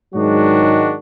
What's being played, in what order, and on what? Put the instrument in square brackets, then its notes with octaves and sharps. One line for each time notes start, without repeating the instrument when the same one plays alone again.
[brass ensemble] G#2 D#3 F#3 G#3 D4 F#4